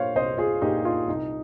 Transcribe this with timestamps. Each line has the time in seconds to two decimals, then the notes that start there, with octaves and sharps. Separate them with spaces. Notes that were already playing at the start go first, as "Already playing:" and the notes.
Already playing: A#2 C5 C#5 F5
0.15 C2 C5 D#5
0.38 F4 G#4
0.62 A#2 D#4 G4
0.85 F4
1.07 C2 D#4